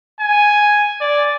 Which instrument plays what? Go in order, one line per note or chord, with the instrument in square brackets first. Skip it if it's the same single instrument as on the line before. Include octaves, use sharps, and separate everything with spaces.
[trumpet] G#5
D5